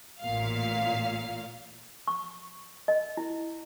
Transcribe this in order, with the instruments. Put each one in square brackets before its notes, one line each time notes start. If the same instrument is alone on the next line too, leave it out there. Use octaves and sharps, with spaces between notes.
[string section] A1 A#2 F5
[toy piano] C#6
D#5
E4